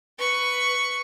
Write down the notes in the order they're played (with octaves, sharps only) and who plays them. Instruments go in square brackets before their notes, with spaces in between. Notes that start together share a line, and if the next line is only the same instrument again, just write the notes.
[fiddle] B4 C#6